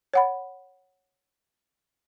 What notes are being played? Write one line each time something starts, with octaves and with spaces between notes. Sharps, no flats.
C#5 F#5 B5